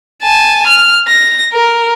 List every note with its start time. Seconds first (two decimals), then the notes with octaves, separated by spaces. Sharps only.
0.23 G#5 A5
0.67 F6
1.08 A#6
1.53 A#4